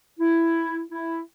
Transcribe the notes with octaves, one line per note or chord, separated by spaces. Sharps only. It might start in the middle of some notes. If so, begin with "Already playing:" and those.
E4
E4